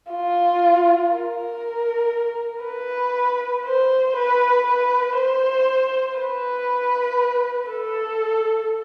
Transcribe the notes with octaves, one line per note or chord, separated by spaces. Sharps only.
F4
A#4
B4
C5
B4
B4
C5
B4
A4